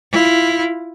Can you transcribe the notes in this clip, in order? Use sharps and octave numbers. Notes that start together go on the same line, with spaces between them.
E4 F4